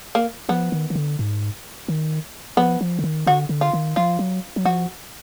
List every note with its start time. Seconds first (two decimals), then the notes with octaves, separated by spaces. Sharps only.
0.15 A#3
0.49 F3 B3
0.72 D#3
0.90 D#3
0.95 D3
1.19 G#2
1.88 D#3
2.57 F3 B3
2.81 F3
2.99 D3
3.04 D#3
3.27 D3 F#4
3.49 D3
3.61 F4
3.73 D#3
3.96 F3 F4
4.19 F#3
4.56 F#3
4.65 F3 F#4